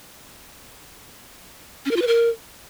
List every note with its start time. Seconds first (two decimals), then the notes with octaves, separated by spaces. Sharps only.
1.86 C#4
1.91 A#4
1.96 F4
2.02 B4
2.07 A#4